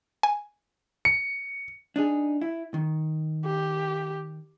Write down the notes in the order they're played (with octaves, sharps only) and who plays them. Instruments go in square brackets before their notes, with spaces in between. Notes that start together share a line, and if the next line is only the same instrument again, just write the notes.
[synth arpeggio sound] G#5
[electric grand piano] C#7
[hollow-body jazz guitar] D4 D#4 G#4
E4
D#3
[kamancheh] G4